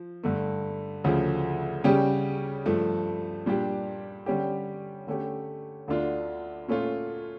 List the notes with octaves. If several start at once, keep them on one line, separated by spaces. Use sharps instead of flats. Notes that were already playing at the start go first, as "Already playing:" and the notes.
Already playing: F3
G2 D3 A3
D2 C#3 F3 A3
C#3 G3 C#4 G4
G2 F3 A3
A#2 G3 D4 G4
D3 G3 C#4 G4
D3 A3 C#4 G4
D2 D3 A3 D4 F4
A#2 A3 C#4 F4